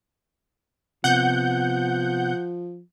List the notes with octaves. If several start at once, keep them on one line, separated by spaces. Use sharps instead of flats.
C3 F3 B3 F#5 G6